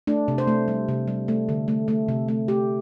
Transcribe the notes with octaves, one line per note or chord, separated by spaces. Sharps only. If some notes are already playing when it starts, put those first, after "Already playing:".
A3 D4
C3
C5
A3
G3
C3
G3
A3
D3
A3
A3
C3
A3
A3 G4